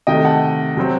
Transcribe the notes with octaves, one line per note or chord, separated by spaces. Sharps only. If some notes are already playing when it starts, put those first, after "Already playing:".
C3 D#3 A3 D#5 G5
F#5 A5
C3 F#3 C4